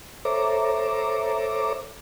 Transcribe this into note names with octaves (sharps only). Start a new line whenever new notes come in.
A4 C5 C#5 E5 A#5 D6